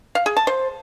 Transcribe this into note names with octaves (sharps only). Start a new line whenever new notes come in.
F5
G#4
A5
C5